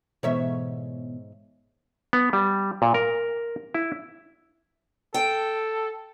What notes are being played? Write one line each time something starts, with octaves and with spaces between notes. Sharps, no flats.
G#2 B2 E3 B3 C#5 E5
B3
G3
A#2
A#4
E4
A4 G5